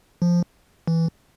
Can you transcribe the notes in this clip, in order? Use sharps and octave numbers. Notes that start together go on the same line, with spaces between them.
F3
E3